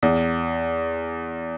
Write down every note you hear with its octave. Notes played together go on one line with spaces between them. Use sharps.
E2